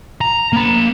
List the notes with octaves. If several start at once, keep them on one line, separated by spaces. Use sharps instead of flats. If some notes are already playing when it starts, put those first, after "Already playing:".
A#5
A#3 B5